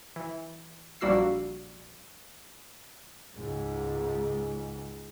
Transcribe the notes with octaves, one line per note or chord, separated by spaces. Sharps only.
E3
A#1 G3 A#3 F#4 E6 C7
C#2 G#2